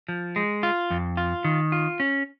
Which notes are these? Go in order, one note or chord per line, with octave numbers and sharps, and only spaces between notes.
F3
G#3
F4
F2
F4
D#3
F4
C#4